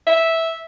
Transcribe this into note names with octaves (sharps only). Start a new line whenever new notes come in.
E5